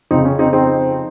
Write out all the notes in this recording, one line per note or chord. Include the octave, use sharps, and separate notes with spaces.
F2 C#3 C4 D#4
C#4
C4 D#4
C4 D#4